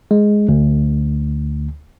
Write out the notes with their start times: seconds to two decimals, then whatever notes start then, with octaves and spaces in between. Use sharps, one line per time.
0.11 G#3
0.49 D2